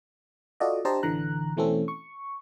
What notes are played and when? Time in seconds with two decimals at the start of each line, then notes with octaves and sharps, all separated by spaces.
0.60 F4 F#4 A4 D5 D#5
0.85 D4 G4 C5 D#5 A5 A#5
1.03 A1 D3 E3 A#5 F#6
1.57 B2 E3 A3 C4 C#4 A4
1.88 C#6